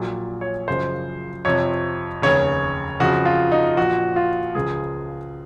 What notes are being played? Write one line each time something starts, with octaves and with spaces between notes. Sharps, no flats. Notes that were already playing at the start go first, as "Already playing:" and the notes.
Already playing: A#1 A#2 F#3
C#5
F#1 F#2 C#3 F3 C5
F2 C3 F3 C#5
F1 D#2 C#3 C#5
F2 C#3 F3 F#4
F4
D#4
A#1 A#2 F3 F#4
F4
C#2 C#3 F3 G#4